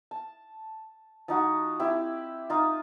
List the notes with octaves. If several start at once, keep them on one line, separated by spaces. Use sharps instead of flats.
A5
F3 D#4 F#4
C4 E4 G4
D#4 F4